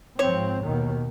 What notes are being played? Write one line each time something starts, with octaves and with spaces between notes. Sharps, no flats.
G#2 F3 C4 C#5
D#2 B2 D#3